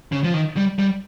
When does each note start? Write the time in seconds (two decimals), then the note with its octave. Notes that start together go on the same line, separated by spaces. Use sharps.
0.12 C#3
0.24 F3
0.34 D#3
0.57 G3
0.79 G3